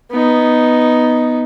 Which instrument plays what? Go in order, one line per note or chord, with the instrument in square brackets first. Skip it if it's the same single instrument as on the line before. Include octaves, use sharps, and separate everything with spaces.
[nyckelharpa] B3 D#4